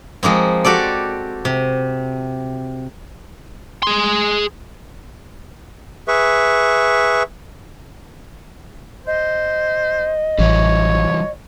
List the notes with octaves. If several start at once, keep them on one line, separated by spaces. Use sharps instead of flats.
F3 G#3 A#3 C4
F#4 G4 A4 D5
C3
G#4 C6
G#4 B4 E5 C#6
C5 D#5
A1 E3 F#3 G3 C#5